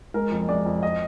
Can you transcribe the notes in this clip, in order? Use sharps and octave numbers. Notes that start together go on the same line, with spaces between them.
G#3 A#4
F2
G#3 D5
F2
D#5